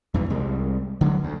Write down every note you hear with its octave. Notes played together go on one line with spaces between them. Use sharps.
E2 G2 B2 E3
C2 G3 G#3
D3 F#3 G#3
D2